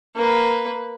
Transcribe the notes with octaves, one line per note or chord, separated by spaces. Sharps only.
A#3 B4